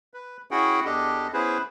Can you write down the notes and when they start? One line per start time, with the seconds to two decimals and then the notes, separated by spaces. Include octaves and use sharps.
0.14 B4
0.51 C#4 E4 F#4 G#4 F#5 G5
0.85 E2 D4 G4 A4 D#5
1.33 B3 C#4 E4 G#4 B4 C5